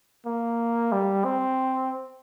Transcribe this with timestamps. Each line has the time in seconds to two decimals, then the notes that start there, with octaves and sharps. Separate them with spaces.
0.26 A#3
0.92 G3
1.25 C4